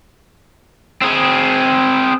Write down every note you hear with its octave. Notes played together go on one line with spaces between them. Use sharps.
C4 G#4